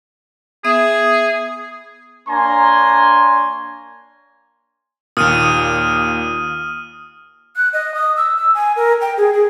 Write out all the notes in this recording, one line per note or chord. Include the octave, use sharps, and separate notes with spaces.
B3 G#4 E5 D#6
A#3 D4 C#5 G#5 A#5 C6
D#2 A#2 D#6 F6 D#7
F#6
D#5
D#6
E6
E6
G#5
A#4
G5
G#4
G#4